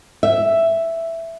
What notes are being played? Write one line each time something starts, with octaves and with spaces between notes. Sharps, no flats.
E5